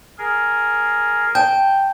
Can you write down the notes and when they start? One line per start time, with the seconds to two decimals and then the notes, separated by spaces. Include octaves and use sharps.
0.18 G#4 A#4
1.35 G5 A5 G6